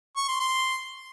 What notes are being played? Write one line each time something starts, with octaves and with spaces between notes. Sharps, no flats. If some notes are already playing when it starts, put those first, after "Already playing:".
C#6
C6
C6